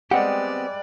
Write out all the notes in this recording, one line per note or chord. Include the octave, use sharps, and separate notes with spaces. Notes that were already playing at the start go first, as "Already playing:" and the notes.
G3 G#3 B3 C4 G4 B4 D5 F#5